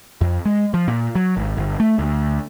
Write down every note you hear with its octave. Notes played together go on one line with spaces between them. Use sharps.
F2
G#3
F3
A#2
F#3
G#1
G1
A3
D2